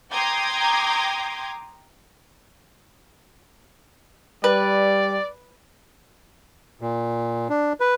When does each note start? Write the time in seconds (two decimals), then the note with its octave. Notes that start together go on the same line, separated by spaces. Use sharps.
0.12 G5 A#5 C6 D6 D#6 G#6
4.44 G3 B4 D5
6.81 A#2
7.49 D4
7.80 B4